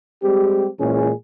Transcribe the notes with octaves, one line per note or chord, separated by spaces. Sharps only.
G3 G#3 C4 G4
A#2 E3 G#3 C#4 G#4